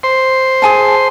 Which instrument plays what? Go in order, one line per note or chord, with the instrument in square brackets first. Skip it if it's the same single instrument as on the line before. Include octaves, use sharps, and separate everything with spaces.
[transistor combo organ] C5 C6
[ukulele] G#4 G#5 A5